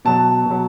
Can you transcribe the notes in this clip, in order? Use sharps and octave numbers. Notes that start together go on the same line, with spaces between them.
B2 F#3 A5
B2
F#3